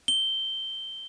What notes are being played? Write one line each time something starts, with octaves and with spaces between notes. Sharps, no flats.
G7